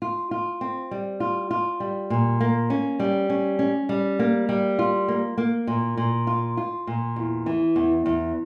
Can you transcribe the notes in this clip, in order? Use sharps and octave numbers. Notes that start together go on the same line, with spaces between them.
F4
F4
C4
G3
F4
F4
G3
A#2
A#3
C#4
G3
C#4
C#4
G3
A#3
G3
F4
A#3
A#3
A#2
A#2
F4
F4
A#2
E2
E3
E2
E2